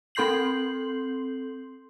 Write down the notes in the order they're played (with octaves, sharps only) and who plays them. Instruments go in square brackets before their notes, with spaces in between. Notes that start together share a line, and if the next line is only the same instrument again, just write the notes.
[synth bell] C4 A4 C6 G6 C7 F#7